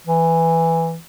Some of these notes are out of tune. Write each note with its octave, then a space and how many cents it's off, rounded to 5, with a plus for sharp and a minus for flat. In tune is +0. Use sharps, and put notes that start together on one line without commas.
E3 +0